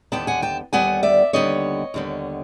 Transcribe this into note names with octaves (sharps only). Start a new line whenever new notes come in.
D#2 D3 G3 B3 G5 A5
F#5 G#5
G5 A5
D#2 D3 G3 B3 F#5 G#5
D5 E5
D#2 D3 G3 B3 C#5 D#5
D#2 D3 G3 B3